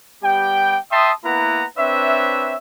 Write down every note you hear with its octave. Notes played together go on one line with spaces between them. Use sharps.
G3 B3 G4 G5
E5 G5 A5 C6 D#6
A#3 B3 E4 B4 F#5 A#5
C4 D4 B4 C#5 E5